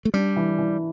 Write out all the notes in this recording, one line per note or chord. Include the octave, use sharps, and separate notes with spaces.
A3
G3 D4
E3
E3